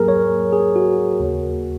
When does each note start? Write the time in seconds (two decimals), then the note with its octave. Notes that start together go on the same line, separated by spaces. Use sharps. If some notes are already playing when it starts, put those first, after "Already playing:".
Already playing: G#2 F#3 A#3 G#4 A#4
0.08 C#5
0.53 G#4
0.76 F#4
1.20 D#2 C#3 A#3